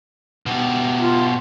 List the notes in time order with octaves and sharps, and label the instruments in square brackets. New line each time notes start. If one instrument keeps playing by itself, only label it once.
[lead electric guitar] B2 G4
[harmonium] F4